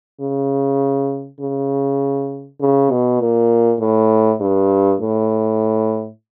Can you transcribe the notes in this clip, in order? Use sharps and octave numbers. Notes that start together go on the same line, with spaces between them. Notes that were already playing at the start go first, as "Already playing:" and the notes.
C#3
C#3
C#3
B2
A#2
A2
G2
A2